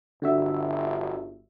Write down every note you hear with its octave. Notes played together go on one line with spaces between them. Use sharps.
G1 D3 F#4 E5